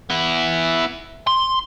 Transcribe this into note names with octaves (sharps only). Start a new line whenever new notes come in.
B3 E4
C6